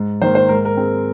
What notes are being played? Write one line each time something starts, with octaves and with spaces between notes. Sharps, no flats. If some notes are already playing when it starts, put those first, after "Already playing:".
Already playing: G#2
D#3 A#3 C5
C5
G#2 A#4
A#4
G#3 C4